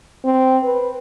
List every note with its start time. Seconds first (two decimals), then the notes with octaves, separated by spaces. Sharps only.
0.24 C4
0.63 B4